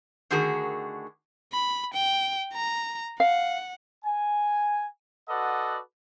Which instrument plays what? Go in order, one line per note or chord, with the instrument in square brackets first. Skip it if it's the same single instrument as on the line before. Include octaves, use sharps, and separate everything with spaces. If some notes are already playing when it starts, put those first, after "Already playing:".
[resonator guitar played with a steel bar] D3 D#3 A3 F#4 G#4 A#4
[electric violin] B5
G5
A#5
[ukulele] F5 [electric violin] F#5
[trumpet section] G#5
F#4 A4 B4 D5 D#5 F#5